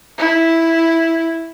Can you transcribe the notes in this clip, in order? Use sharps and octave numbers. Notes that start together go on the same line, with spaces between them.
E4